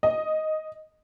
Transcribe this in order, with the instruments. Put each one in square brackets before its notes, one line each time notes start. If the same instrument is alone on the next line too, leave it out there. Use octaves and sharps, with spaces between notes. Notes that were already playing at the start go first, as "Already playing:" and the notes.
[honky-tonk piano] D#5